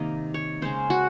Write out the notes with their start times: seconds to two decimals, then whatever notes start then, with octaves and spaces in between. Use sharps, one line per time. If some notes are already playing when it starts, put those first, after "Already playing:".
Already playing: C3 D#3 A#3 D#5
0.34 C#5
0.62 C#3 G#3 C#4 C5
0.90 F#4